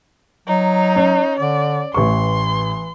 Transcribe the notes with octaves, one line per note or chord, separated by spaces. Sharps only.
F#3 D#4
C#4
D3 D5
A1 E3 C6 C#6